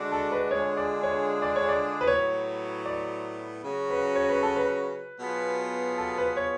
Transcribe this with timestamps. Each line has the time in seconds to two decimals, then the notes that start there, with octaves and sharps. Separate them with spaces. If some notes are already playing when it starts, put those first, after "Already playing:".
Already playing: D3 G#3 D4 F#4
0.12 A4
0.32 B4
0.51 D3 G#3 D4 F4 G#4 C#5
0.77 D5
1.03 C#5
1.42 D5
1.56 C#5
1.69 D5
2.01 B4
2.07 A2 F#3 B3 C#5
2.86 D5
3.63 C#3 F#3 C#4 F#4
3.90 B4
4.15 C#5
4.29 B4
4.43 A4
4.56 B4
5.20 B2 F#3 B3 F4 G#4
5.98 A4
6.18 B4
6.37 C#5